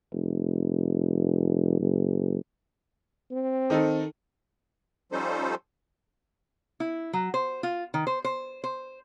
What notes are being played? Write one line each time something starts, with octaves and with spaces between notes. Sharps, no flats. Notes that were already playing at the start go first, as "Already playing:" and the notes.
F1
F#1
C4
D#3 D#4 A4
F3 G3 C#4 D#4 A4 C5
E4
F#3
C5
F4
D#3
C5
C5
C5